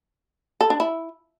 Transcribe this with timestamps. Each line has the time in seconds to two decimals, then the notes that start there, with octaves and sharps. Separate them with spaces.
0.61 A4
0.70 D4
0.80 E4